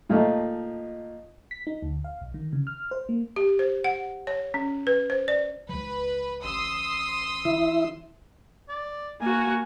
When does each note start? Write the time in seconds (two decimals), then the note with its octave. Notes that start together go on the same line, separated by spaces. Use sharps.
0.09 A#2 F3 A3 D#4
1.51 B6
1.67 D#4
1.82 D2
2.04 F5
2.21 B1
2.34 D#3
2.53 C#3
2.67 F6
2.91 C5
3.09 A#3
3.36 G4
3.59 C5
3.84 F#5
4.27 C#5
4.54 C#4
4.87 B4
5.10 C5
5.28 D5
5.69 C#2 F3 B4
6.44 A1 C6 D#6 E6
7.45 E3 E4
8.69 D5
9.21 A#3 F#4 G#5